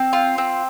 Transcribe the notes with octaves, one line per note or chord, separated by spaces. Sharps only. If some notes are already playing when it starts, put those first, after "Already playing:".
Already playing: C4
F4
C4